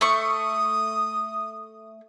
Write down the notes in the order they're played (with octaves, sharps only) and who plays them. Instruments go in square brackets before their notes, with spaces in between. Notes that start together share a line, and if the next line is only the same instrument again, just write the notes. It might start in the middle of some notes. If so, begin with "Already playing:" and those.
[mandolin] A3 C#6 [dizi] D#6